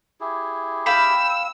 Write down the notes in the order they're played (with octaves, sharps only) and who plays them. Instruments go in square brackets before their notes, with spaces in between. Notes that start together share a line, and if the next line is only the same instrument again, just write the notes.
[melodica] E4 G4 G#4
[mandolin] F5 G5 B5 [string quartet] E6